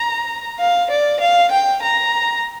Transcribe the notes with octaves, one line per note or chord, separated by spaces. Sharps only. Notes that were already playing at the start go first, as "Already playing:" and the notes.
Already playing: A#5
F5
D5
F5
G5
A#5